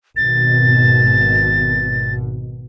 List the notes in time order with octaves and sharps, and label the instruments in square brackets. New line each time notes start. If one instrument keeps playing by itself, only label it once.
[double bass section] G#1 B2 [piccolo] A6